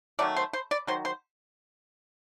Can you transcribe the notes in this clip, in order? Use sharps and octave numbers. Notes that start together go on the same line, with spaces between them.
D#3 F#3 A3 D5
C5
C5
D5
D#3 F#3 C5
C5